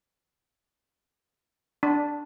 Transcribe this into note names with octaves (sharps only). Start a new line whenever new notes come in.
D4